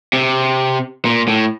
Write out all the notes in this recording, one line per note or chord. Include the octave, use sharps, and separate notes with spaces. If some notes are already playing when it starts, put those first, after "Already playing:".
C3
A#2
A2